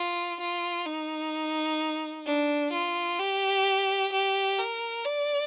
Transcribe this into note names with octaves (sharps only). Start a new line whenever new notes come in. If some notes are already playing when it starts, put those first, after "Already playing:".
Already playing: F4
F4
D#4
D4
F4
G4
G4
A#4
D5